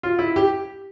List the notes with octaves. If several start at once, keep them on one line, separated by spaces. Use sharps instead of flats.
F4
E4
G4